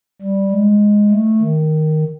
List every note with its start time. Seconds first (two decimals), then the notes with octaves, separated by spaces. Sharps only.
0.22 G3
0.51 G#3
1.11 A3
1.41 D#3